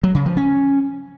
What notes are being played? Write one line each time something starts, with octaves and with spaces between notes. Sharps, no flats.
F#3
C#3
F3
C#4